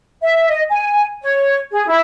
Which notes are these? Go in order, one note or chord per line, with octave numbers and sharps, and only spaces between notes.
E5
D#5
G#5
C#5
G#4
E4